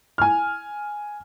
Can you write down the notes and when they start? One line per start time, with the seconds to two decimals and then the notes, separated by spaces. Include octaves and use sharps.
0.18 G#5 F6